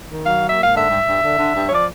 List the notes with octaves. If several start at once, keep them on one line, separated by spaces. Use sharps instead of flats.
D#3
F#3 F5
A#3
E5
G#2
F5
D3 E5
G2
G2
D3
D3
G2
C#5
F3 D5